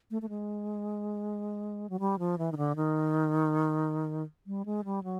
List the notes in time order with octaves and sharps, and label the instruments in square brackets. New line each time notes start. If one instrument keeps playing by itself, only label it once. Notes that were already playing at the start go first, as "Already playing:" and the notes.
[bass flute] A3
A3
G#3
F#3
G3
F3
E3
D#3
D3
D#3
G3
G#3
G3
F#3